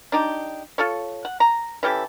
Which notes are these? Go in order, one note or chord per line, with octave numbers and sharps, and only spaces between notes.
D4 D#4 G4
F4 A4 C#5
F#5
A#5
E3 C#4 G4 A4